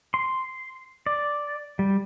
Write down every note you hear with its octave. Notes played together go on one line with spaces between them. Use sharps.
C6
D5
G3